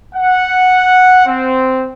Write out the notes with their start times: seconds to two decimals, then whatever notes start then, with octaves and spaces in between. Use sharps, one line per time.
0.15 F#5
1.26 C4